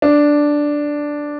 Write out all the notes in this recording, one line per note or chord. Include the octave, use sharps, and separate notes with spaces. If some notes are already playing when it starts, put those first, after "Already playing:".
D4